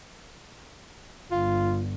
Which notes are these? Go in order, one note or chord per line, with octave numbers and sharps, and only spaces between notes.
G1 F4